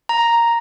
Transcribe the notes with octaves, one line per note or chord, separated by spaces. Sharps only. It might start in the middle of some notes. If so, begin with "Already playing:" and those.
A#5